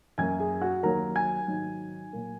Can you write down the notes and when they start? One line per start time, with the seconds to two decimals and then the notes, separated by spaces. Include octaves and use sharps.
0.18 F#2 F#3 A#3 G#5 G#6
0.39 G#4 G#5
0.61 F#4 F#5
0.83 D#2 D#3 F#3 A#3 A#4 A#5
1.16 G#5 G#6
1.48 G#2 D#3 F#3
2.13 A#2 F#3 A#3